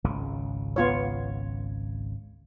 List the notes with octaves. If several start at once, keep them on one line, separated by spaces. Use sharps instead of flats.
G#1 C#2 C#3
B3 F4 C#5